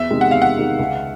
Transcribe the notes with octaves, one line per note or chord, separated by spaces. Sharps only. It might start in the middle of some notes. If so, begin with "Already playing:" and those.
Already playing: E2 E5
C3 D#3 G#3
F#5
E2 F5
F#5
C3 D#3 G#3
C#2